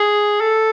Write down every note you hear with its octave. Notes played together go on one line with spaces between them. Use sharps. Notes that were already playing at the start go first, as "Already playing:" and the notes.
Already playing: G#4
A4